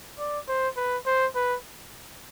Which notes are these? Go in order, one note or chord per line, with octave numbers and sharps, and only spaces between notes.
D5
C5
B4
C5
B4